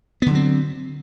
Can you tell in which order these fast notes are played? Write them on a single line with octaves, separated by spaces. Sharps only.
B3 D3 F#3 C4